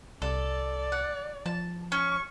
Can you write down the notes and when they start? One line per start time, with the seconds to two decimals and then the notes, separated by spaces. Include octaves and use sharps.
0.22 C2 A4 D5
0.92 F#5
1.46 F3 A5
1.92 C#4 C#6